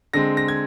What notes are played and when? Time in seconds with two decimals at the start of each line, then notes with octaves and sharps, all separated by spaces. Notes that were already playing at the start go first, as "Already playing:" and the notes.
0.13 D3 G#3 C4 A#6
0.37 A#6
0.48 G#6